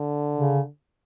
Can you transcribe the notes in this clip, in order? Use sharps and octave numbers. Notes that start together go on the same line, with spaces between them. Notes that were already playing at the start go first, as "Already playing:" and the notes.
Already playing: D3
C#3